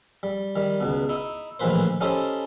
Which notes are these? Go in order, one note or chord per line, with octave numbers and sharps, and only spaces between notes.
G3
D#3 G3
C#2 B2
D#4 E4
A#1 A2 D#3 E3 B4 C5
C#4 D#4 E4 G4 A4 C5